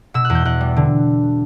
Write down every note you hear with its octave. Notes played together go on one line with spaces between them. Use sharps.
B2 E6
F#6
E2
G6
E2 F#6
G3
D3